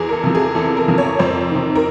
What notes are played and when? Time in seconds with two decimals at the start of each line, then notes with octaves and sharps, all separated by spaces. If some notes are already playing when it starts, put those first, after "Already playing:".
Already playing: E2 G#4
0.09 A#4
0.13 A4
0.23 C3 F3
0.35 G#4
0.55 E2 A4
0.77 A#4
0.88 C3 F3
0.98 C#5
1.19 F2 C5
1.51 C3 D#3
1.76 A#4